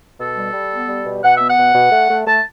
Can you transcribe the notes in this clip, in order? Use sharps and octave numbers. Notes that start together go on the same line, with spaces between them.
B2 A4
G3
G3
B3
G3
B2
B2 F#5
B3 E5
F#5
B2
B2
A3
A3
A3 A5